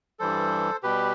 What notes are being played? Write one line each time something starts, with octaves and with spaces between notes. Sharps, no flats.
G2 E3 G3 A4 C5
B2 G3 G4 B4